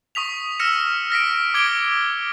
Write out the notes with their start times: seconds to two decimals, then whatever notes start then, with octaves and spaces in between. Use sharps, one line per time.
0.15 C#6 D#6 B6 F7
0.59 E6 F6 A#6 C#7 E7
1.10 F6 A#6 B6 D7
1.54 D6 G#6 D7 G7